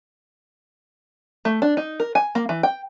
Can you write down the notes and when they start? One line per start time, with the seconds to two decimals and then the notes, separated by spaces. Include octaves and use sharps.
1.45 A3
1.62 D4
1.77 D#4
2.00 A#4
2.15 G#5
2.35 A#3
2.49 E3
2.63 G5